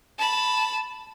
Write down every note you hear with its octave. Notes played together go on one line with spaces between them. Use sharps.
A5 B5